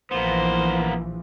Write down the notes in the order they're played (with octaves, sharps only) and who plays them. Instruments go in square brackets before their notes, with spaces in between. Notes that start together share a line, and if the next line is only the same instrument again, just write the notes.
[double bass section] A#1 E3 F3 [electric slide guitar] A#3 B3 [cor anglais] C5